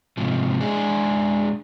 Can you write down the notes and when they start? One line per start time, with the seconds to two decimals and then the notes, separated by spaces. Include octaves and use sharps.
0.17 G#2 C3 F3
0.61 G#3 D4 G#4